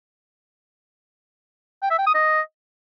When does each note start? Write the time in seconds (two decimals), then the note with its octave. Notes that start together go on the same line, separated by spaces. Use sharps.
1.83 G5
1.91 E5
1.99 G5
2.07 D#6
2.14 D#5